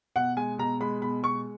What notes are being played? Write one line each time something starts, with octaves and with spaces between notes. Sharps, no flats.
B2 F#5
G#3 G#5
B2 A#5
G#3 B5
B2 B5
G#3 C#6